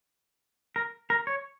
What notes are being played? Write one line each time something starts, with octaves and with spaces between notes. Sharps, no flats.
A#4
A#4
C#5